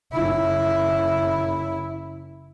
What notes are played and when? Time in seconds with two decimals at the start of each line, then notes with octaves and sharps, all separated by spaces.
0.12 F#1 E4